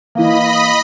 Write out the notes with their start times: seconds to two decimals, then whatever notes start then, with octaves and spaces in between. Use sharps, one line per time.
0.15 E3 A#3 D#5 B5